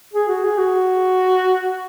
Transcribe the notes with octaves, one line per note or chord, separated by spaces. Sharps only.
G#4
F#4
G#4
F#4